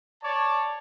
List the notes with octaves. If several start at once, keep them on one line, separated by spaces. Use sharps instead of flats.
C#5 D5 A5